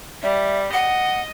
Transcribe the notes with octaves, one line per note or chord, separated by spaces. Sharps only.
G3 E5
D#5 F#5